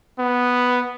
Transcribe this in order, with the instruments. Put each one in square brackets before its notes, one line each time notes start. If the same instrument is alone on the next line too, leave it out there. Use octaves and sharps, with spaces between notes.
[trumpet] B3